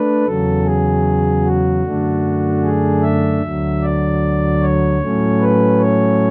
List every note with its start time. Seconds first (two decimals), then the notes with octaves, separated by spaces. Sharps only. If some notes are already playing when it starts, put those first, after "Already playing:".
Already playing: A3 D4 B4
0.25 E2 C#3 F#3 A4
0.65 G#4
1.44 F#4
1.83 F#2 D3 A3 D4
2.63 G#4
3.02 E5
3.42 D2 D3 F#3
3.82 D5
4.61 C#5
5.01 A2 F#3 A3 C#4
5.40 B4
5.80 C#5